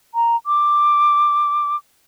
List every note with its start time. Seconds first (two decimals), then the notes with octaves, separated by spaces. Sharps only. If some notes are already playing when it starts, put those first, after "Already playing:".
0.15 A#5
0.46 D6